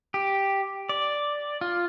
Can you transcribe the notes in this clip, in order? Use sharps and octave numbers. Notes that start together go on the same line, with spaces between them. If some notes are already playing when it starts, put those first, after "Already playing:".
G4
D5
F4